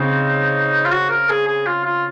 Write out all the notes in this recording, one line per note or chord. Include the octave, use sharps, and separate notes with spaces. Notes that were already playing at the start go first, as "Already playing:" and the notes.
Already playing: C#3 C4 D#4
F4
F#4
A#4
G#4
G#4
F4
F4